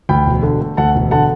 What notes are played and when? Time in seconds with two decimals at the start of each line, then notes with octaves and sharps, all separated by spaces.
0.09 D2 G5 B5
0.26 E1
0.43 D3
0.61 A3
0.77 D2 F#5 A5
0.95 E1
1.11 D3 F#5 A5